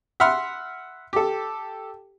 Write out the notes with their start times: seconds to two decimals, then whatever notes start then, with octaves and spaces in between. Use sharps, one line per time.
0.20 E5 F#5 B5 C6 F6
1.13 G4 A4